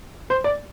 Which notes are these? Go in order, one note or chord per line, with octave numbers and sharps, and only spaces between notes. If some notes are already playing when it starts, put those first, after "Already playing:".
C5
D5